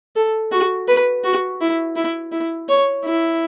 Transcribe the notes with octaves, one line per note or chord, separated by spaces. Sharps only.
A4
F#4
B4
F#4
E4
E4
E4
C#5
E4